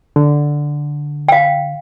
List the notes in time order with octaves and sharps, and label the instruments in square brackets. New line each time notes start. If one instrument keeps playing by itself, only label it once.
[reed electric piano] D3
[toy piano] F5 G5